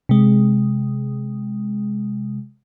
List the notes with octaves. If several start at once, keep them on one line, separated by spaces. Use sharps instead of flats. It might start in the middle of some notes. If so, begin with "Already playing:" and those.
C3 G#3